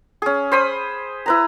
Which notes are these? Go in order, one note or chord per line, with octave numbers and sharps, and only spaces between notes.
C#4 G#4
C5 B5 D#6
E4 B4 A#5